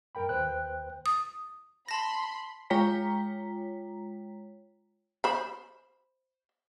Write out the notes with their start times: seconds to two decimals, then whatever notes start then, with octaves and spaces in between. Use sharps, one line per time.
0.15 F#2 A#4 G5 B5
0.29 D#2 B4 C5 G5 F#6
1.06 D#6
1.89 A5 B5 C6 A#6
2.70 G#3 F4 C#5 G5 A#5 B6
5.24 C5 B5